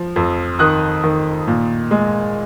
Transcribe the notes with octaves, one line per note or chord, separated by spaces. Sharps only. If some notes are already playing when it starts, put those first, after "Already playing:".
Already playing: F3
F2
D#3 D#6 F#6
D#3
A#2
G#3